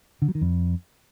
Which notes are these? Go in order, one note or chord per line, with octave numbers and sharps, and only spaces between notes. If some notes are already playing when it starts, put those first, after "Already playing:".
D3
F#3
D#3
F2